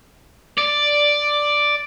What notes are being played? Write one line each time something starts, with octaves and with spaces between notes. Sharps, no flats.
D5